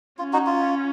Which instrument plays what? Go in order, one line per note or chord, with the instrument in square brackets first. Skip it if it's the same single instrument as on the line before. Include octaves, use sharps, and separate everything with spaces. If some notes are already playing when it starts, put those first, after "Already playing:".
[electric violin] C#4 [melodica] F4
[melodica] D#4 F#4
F4